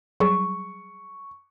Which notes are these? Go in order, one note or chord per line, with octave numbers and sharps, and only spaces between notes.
F#3 G3 G#4 C#6